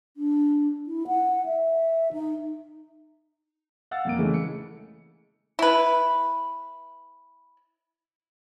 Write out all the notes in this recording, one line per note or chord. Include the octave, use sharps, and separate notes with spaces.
D4
E4
F#5
E5
D#4
F5 F#5 E6 A6
F2 A#3 D7
C#3 E3 G#3 A3
C#7
E4 B4